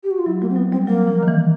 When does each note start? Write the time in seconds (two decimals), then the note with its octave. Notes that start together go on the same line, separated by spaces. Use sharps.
0.03 G4
0.11 F#4
0.18 F4
0.26 F#3 E4
0.41 F#3 A#3
0.50 C4
0.56 F#3 B3
0.72 G3 C4
0.87 F#3 A#3
1.07 F3
1.23 D#3
1.28 E3